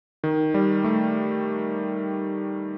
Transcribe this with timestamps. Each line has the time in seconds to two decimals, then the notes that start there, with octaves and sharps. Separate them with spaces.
0.24 D#3
0.54 G3
0.84 A3